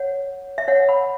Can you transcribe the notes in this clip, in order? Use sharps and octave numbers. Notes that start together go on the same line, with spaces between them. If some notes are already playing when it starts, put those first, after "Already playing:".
Already playing: C#5 F#5
E5
C#5 F#5
F#5 B5